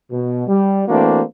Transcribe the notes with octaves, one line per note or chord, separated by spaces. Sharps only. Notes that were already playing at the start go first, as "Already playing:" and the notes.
B2
G3
E3 A3 A#3 C4 D4 F#4